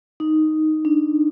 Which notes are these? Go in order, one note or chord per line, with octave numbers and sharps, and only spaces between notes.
D#4
D4